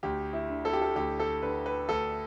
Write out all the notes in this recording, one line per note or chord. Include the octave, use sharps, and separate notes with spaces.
D2 G4
E4
D3
A4
G4
A4
D2 G4
A4
D3 B4
B4
D2 A4